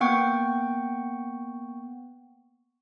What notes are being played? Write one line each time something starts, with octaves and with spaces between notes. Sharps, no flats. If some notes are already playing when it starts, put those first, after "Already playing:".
A#3 B3 F#5 G5 C#6